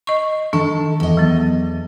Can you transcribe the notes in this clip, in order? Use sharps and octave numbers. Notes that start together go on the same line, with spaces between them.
D#5 C#6
D#3 D4 A4 A5
E2 D#5
F#3 B3